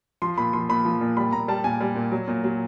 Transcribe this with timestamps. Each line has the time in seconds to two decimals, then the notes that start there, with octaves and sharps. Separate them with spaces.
0.22 F3 C6
0.38 A#2 B5
0.53 F3 C6
0.69 A#2 B5
0.85 F3
1.01 A#2
1.17 G3 B5
1.33 A#2 A#5
1.48 G3 A5
1.64 A#2 G#5
1.81 G3
1.95 A#2
2.12 F#3
2.28 A#2
2.44 F#3